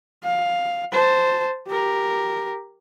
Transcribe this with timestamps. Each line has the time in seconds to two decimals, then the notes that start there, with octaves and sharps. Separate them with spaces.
0.23 F5
0.92 C5 A5
1.67 G4 A#4